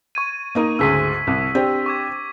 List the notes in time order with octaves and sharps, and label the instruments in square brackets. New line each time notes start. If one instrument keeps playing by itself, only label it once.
[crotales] C#6 G#6 D#7
[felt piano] A#3 D#4 A#4
[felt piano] D2 G#2 C#3 [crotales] E6 B6 D#7
[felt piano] C2
C4 D4 G4
[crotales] C#6 D6 G#6